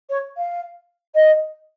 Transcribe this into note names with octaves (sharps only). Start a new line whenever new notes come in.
C#5
F5
D#5